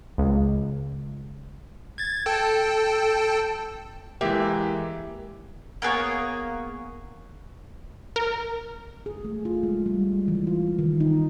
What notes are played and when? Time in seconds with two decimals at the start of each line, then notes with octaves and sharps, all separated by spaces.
0.18 C#2
1.98 G#6 A6
2.26 A4 G5 A5
4.21 E3 G#3 A#3 G4 E5
5.82 A#3 B3 G#4 C#5
8.16 A#4
9.06 G#4
9.25 A3
9.45 F4
9.63 G#3
9.86 G3
10.28 E3
10.47 F4
10.79 D#3
11.00 D#4